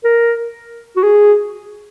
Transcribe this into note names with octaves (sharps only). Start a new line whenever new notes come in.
A#4
F#4
G#4